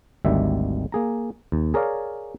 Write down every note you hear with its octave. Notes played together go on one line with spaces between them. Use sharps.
G#1 D2 D#3 G3 E5
A#3 G#4 A#5
D#2
G#4 A#4 C#5 D5 F5